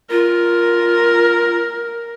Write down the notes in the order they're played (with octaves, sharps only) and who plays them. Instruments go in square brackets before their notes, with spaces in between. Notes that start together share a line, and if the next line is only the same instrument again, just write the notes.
[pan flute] F4 [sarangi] A#4